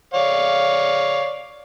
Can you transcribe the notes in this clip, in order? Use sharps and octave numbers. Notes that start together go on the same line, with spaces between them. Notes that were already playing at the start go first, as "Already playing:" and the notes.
C#5 D5 F5